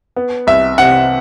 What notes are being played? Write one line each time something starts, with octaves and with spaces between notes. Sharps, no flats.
B3
C2 E5
C3 F#5